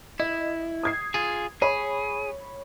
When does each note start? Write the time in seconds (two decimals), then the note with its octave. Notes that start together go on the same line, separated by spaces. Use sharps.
0.20 E4 D#5
0.83 D#6 G#6 C7
1.14 F4 G#4
1.62 G#4 C#5 B5